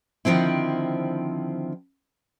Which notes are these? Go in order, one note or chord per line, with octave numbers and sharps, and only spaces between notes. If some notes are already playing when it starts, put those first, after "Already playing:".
D3 D#3 F3 C4 E4